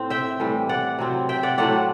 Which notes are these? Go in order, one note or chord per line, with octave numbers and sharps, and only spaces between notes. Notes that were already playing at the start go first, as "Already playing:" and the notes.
Already playing: A2 C4
E5 G5
A2 E3 G3
D5 F#5
C3 F#3 C4 E4
E5 G5
D5 F#5
A2 F#3 A3 C4 D5 F#5